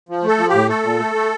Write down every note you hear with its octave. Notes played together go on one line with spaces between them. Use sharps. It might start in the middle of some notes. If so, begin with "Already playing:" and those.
F3
A3 A4
F3
A2 G4
A3 A4
A#2
A3
A3